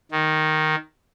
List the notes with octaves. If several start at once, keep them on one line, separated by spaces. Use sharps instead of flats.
D#3